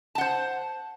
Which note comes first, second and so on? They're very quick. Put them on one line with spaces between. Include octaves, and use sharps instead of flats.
A5 F#5 C5